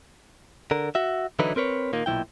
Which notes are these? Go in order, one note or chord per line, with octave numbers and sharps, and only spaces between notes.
D3 A#4
F#4 E5
D3 E3 F#3 D#4 E4 B4
C4 A#4 B4 C#5
A#2 D#3 A#3
B1 A#2 F3 E4 G5